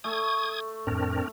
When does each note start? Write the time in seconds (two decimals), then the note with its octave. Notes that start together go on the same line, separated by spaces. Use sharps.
0.04 A3 D#6 G#6
0.87 F2 A2 C4 D4 A#4